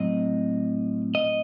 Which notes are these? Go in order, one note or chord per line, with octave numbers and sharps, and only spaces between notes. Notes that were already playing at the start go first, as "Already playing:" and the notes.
Already playing: A2 F#3 C4 D#5
D#5